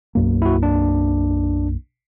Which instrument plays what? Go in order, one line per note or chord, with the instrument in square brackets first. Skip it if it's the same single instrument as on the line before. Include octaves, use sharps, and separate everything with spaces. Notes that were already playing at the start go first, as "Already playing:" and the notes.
[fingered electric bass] B1 F#2 A#3
[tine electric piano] E4 F#4
D4